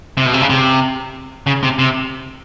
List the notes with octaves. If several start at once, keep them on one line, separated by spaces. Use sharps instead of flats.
C3
B2
C3
C#3
C3
C#3
C3
C3